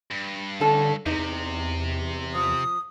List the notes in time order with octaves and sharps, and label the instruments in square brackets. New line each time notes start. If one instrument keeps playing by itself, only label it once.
[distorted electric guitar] G2
[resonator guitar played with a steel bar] A2 C#4 A4 [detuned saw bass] D3
[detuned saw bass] E2 [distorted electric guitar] C3 [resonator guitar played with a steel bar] D#4
[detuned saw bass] E2
[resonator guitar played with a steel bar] F3 [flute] D#6